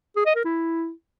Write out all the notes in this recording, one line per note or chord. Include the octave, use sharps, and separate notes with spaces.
G#4
D#5
A#4
E4